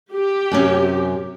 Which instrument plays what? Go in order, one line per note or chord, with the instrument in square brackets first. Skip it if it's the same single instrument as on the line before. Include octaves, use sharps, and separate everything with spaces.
[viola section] G4
[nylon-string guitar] F#2 C3 C#4